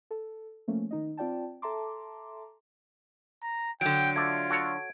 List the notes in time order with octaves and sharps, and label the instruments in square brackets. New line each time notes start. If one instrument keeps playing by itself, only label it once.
[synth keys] A4
F3 A3 A#3 C#4
D#3 D#4 D#5
C4 F4 D5 G5 A5
A4 E5 A5 A#5 C6 D6
[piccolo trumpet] A#5
[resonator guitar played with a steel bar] D3 F#3 [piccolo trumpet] G5 [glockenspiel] D7
[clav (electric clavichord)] A3 D5 [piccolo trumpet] F4 [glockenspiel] G#6
[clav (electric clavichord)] F#4 A4 C#5